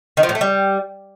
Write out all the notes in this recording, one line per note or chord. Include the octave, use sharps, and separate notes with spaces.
D#3
F3
A2
A3
G3